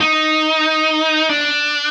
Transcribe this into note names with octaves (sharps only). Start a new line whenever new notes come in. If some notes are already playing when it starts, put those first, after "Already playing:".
D#4
D4